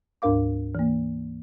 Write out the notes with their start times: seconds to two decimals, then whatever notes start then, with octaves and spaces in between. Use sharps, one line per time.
0.22 D2 G#2 D4 A#4 F5 D6
0.75 E3 A#3